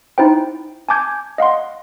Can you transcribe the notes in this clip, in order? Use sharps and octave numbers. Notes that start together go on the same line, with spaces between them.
D#4 E4 C5 G5
G#5 A5 D6 G6 G#6
D#5 F5 F#5 C6